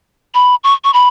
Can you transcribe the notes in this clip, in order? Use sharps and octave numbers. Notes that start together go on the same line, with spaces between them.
B5
C#6
C#6
B5